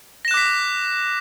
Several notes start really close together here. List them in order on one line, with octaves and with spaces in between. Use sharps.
A#6 E7 F#6 D6 B6